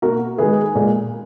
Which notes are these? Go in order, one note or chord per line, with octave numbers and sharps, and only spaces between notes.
B2 A#3 F#4 A#4
D#3 G#3 G#4 B4
A#2 G#3